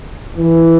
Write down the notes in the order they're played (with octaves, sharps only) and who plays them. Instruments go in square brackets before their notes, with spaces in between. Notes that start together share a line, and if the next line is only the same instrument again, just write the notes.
[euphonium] E3